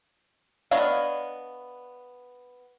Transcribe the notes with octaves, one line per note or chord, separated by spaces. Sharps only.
B3 D4 C#5 D#5 F5